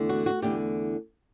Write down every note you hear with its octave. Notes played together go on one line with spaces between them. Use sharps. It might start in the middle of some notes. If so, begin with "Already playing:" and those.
Already playing: E2 D3 A3
F#4
F#4
E2 D3 A3 G4